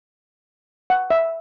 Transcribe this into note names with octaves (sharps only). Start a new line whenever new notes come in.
F#5
E5